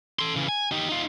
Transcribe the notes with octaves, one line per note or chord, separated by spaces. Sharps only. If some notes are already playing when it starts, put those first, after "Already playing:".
A4 C6
C#3 E3
G#5
D#4 G4
D#4 F4